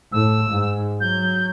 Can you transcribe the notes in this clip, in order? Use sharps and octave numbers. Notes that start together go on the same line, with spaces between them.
A2 E6
G#2
F#3 G6